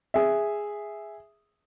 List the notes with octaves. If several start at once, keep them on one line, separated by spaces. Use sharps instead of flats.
G#4 E5